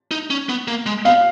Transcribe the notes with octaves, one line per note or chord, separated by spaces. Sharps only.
D#4
C#4
B3
A#3
G#3
B3 F5